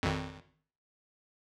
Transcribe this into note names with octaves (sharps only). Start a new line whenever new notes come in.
G#1 F2